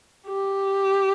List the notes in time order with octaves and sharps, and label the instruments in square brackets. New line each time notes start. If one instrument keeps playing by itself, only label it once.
[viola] G4